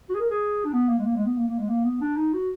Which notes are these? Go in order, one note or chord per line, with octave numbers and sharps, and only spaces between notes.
F#4
G#4
A#4
G#4
D4
B3
A#3
G#3
A#3
G#3
B3
A#3
A#3
G#3
A#3
B3
D4
D#4
F#4